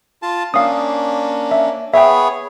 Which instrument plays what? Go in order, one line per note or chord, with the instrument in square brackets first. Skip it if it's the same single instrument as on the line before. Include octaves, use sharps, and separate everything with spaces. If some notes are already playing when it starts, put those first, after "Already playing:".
[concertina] F4 A5
[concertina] A#3 C#4 D4 [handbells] F5 D#6
[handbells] E5
[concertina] B3 G#4 C#5 [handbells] E5 G5